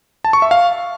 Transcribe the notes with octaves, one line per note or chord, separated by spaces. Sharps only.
A5
C#6
E5
F5